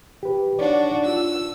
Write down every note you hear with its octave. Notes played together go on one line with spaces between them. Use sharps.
G4 B4
D4 D#4 F#4 C#5 D5
F4 E6